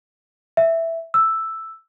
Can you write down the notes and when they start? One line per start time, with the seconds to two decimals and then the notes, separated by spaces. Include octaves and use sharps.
0.57 E5
1.14 E6